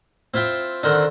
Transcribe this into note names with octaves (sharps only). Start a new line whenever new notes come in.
C4 E4 F4 E5 G5
D3 D#3 C4 A#4 C5 F#5